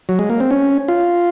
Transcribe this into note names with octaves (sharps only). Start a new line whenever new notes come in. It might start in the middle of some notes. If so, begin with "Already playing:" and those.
F#3
G#3
A#3
C4
C#4
F4